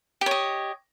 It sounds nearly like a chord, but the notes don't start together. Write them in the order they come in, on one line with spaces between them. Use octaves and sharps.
G4 C#5 D#5